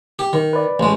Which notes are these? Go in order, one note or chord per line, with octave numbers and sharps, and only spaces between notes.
G4
D#3
B4 D5
A1 G#3